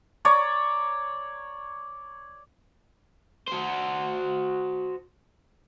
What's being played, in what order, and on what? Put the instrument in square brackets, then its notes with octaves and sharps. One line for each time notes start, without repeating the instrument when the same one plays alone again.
[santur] C#5 D5 A#5
[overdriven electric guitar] F#4 C5